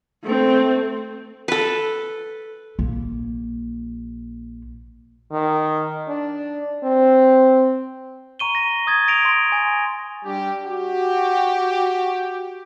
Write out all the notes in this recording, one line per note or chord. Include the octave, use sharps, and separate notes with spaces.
A3 C4
A4 B4
A#1 A#3
D#3
D4
C4
A#5 C#6 D#7 G7
A#6
D#6 G#6 A6
A#6 D7 F7
C6
G#5
G3 D4 G4
F#4 G4